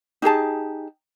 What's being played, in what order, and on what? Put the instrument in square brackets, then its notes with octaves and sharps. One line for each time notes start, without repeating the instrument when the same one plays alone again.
[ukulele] D#4 G4 G#4 A5